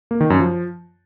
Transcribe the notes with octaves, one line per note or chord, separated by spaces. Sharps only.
A#3
D#3
F#2
F3